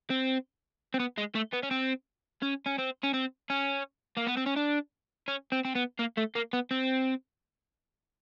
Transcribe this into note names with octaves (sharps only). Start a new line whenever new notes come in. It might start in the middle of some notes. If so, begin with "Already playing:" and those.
C4
C4
B3
G#3
A3
B3
C#4
C4
C#4
C#4
C4
C#4
C4
C#4
A#3
B3
C4
C#4
D4
C#4
C4
C4
B3
A#3
A3
A#3
B3
C4